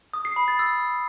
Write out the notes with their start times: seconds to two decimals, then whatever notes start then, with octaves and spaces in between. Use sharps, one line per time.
0.14 D#6
0.25 C7
0.36 B5
0.48 A6
0.59 E6